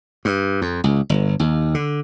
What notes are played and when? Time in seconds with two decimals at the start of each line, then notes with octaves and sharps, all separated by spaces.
0.25 G2
0.62 F2
0.84 C#2
1.10 G1
1.39 D#2
1.74 D3